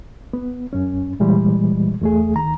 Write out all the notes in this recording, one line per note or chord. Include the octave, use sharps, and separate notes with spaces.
B3
F#2 C#4
A#2 E3 G3 G#3
E2 A3 G#4
D2 D#3 A#5